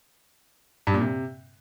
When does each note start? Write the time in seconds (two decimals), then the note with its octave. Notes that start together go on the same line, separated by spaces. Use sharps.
0.87 G2
0.94 A#2
1.01 C3